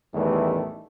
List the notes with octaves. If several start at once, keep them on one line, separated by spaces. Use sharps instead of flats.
A1 E2 D#3 E3 G3 A3